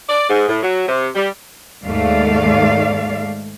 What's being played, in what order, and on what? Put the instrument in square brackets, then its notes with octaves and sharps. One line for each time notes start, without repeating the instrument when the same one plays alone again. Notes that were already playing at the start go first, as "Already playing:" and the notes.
[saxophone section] D5
G#2
A2
F#3
C3
G3
[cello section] D#2 G#2 A3 D5 F5